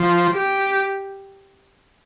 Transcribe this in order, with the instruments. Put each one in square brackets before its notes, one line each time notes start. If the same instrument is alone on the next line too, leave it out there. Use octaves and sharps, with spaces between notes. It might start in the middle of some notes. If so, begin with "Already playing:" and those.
Already playing: [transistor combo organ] F3
[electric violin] G4